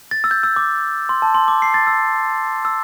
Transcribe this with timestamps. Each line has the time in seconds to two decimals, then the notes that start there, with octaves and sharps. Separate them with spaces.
0.11 A6
0.24 E6
0.31 G6
0.43 E6
0.56 D6
1.09 C6
1.22 A5
1.35 C6
1.48 D6
1.62 C7
1.74 A6
1.87 E6
2.65 E6